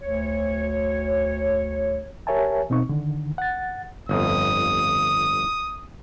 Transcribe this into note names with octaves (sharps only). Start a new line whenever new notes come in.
D2 C#5
G4 A#4 C#5 E5 G#5 A5
B2 C4 D#4 C#6
D3 D#3
F#5 A6
G1 F2 D#6